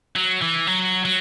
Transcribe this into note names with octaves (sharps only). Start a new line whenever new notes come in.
F#3
E3
F#3
F#3